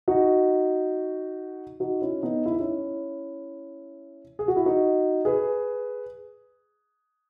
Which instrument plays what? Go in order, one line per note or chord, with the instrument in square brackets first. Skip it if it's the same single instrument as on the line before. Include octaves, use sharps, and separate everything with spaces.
[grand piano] D#4 F#4
D#4 F#4
C#4 E4
B3 D#4
E4
D#4
C#4 E4
G#4
F#4
E4
D#4 F#4
G#4 B4